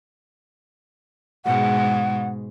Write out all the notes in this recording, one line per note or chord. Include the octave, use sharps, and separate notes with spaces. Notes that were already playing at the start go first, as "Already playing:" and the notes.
G#2 B2 G#3 F#5